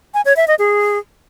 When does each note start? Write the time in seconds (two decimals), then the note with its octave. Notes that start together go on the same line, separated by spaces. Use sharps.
0.14 G#5
0.25 C#5
0.36 E5
0.48 D#5
0.59 G#4